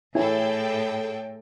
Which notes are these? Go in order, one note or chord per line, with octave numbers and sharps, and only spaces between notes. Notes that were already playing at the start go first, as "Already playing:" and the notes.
A2 E4 G#4 A4 C#5 G5 G#5